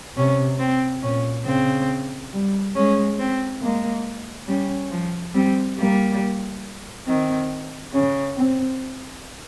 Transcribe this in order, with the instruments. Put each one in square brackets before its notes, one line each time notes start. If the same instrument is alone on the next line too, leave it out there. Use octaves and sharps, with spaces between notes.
[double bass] C3 [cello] C#4
[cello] C4
[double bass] A#2 [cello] C#4
[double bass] C#3 [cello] C4
[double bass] G3
[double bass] G#3 [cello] C#4
[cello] C4
[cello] G#3 [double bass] A#3
[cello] G3 [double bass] C#4
[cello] F3
[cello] G3 [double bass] C4
[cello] G3 [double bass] A#3
[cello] D#3 [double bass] C4
[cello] C#3 [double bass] C#4
[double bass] C4